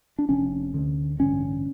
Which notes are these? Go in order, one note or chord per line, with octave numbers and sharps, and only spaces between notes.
D4
F1 F2 C3 C#4
D2 D3
A1 G2 D3 C#4